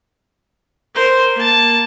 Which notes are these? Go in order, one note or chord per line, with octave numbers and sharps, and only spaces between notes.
A#4 C5
A#3 A5